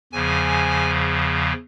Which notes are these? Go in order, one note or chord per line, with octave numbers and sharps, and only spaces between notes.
E2 C#3 F3 G#5